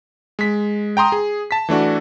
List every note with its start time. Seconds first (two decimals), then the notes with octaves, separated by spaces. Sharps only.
0.39 G#3 B6
0.97 G5 A#5 C6 D#6
1.12 G#4
1.51 A5 B6
1.69 E3 A3 D4 F#4